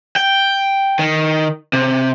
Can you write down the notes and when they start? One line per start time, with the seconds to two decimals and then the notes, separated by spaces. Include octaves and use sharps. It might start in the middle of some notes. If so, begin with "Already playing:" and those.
0.16 G5
0.99 D#3
1.73 C3